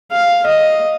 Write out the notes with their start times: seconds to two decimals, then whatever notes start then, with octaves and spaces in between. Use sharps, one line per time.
0.12 F5
0.46 D#5